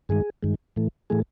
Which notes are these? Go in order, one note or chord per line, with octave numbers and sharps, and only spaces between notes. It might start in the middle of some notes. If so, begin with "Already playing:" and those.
G2 D#3 G#3 G#4
G2 D#3 G#3
A2 E3 A3
A2 E3 A3 G#4